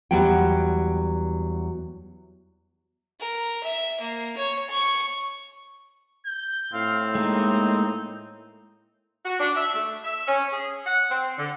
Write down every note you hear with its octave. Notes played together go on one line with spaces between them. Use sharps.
E2 F#3 G3 B3 G5
A#4
E5
A#3
C#5
C#6
G6
A2 C4 F5
G#3 A#3 D#4
F#4
D4
E5
A3
E5
C#4
G#4
F#5
C4
D3